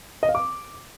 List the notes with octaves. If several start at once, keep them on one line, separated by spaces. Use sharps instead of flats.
D#5
F5
D6